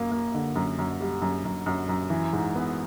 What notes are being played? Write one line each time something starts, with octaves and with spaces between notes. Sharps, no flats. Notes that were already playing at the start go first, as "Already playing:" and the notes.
Already playing: F#2 A#3
A#3
D3
F#2
F#2
G3
F#2
F#2
F#2
F#2
E3
G#2
B3